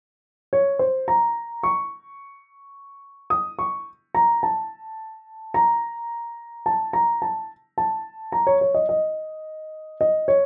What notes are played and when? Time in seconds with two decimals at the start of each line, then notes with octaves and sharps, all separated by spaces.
0.53 C#5
0.79 C5
1.08 A#5
1.63 C#6
3.30 D#6
3.59 C#6
4.15 A#5
4.43 A5
5.54 A#5
6.66 A5
6.93 A#5
7.22 A5
7.78 A5
8.32 A#5
8.47 C#5
8.61 C#5
8.74 D#5
8.89 D#5
10.01 D#5
10.28 C#5